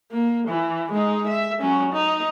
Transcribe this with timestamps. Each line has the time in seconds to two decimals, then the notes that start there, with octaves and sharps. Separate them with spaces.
0.12 A#3
0.48 E3
0.92 G#3 D#4
1.28 E5
1.60 F#3 C#4
1.93 D#4